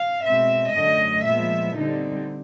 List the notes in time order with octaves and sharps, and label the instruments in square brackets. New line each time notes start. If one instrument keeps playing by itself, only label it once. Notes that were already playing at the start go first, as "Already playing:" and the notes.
Already playing: [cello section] F5
B2 G#3 C4 E5
F#2 D3 F#3 A3 D#5
A#2 F3 G#3 B3 E5
D3 G3 C4 D#4